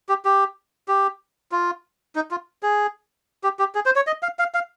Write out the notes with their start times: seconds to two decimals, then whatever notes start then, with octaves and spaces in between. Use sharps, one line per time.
0.09 G4
0.25 G4
0.88 G4
1.52 F4
2.15 D#4
2.31 F4
2.63 G#4
3.44 G4
3.59 G4
3.75 G#4
3.86 C5
3.96 C#5
4.07 D#5
4.23 F5
4.39 F5
4.54 F5